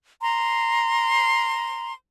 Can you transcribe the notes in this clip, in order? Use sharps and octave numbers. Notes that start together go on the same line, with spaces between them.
A#5 C6